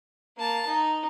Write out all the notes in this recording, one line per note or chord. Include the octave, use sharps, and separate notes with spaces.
A#3 A5
D#4